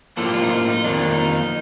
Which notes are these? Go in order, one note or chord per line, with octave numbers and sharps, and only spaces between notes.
A2 F3 A#3 A4
G4
F4
D#4
F4
D#4
F2 D#3 A#3 D4
C4
D4
D#4